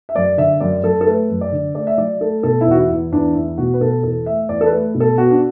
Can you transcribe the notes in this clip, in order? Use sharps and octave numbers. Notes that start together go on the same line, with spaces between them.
E5
F#2 D5
D3 E5
F#2 D5
F#2 A4
A4
A3 B4
F#2
D5
D3
A3 D5
E5
F#3 D5
A3 A4
B2 A4
E4
E2 F#4
E4
E2
E2 D4
E2 E4
B2 F#4
B4
B2 A4
E2 A4
A3 E5
E2 D5
A4
B4
A3
B2
A4
B3 F#4
D4